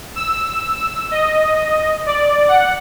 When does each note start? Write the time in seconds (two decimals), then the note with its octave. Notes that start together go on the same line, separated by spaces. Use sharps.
0.15 E6
1.11 D#5
2.06 D5
2.48 F#5